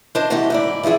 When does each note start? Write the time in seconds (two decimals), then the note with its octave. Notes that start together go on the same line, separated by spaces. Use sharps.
0.15 D4 C5 D#5
0.30 C3 E3 D#4 F#4 G4 D#5
0.50 G#2 E4 D5
0.83 E3 F3 E4 G#4 E5